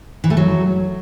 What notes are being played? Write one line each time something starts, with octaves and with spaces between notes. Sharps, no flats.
E3
A3
F#3